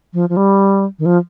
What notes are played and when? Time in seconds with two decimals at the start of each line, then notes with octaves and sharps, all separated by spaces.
0.14 F3
0.29 F3
0.37 G3
0.99 D#3
1.06 F3